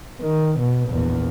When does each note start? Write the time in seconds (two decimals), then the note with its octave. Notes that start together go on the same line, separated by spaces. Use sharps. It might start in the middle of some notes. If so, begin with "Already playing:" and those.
0.21 D#3
0.59 B2
0.89 A#1 E2